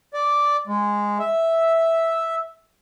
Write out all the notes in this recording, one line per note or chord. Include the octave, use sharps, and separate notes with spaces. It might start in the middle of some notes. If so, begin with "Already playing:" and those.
D5
G#3
E5